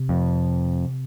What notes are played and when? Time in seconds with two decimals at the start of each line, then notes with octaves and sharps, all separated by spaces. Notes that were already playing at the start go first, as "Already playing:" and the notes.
Already playing: C3
0.09 F2